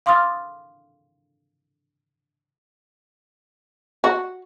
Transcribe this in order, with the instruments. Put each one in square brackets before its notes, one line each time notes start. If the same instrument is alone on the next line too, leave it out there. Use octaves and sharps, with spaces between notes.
[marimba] F5 C6 D6 D#6 F6 A6
[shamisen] F#4